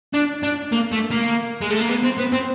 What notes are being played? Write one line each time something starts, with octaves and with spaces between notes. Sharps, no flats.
D4
D4
A#3
A3
A#3
G#3
A3
A#3
B3
C4
B3
C4